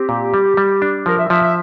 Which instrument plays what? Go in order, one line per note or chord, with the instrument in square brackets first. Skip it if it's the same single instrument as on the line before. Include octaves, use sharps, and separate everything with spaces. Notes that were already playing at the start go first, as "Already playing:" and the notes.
Already playing: [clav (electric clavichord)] C4 [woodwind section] G4
[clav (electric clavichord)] A#2
G3
G3
D4
[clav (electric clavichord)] F3 [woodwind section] A#4
[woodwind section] E5
[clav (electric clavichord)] F3 [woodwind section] E5
[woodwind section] E5